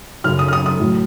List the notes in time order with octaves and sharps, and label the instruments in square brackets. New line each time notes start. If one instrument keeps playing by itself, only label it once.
[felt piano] F#2 C#3 F#3 F6
D#6
F6
D#6
D#6
A2 F#3